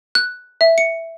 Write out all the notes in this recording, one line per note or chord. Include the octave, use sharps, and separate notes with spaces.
F#6
E5
C#7